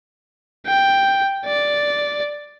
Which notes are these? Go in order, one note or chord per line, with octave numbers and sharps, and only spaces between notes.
G5
D5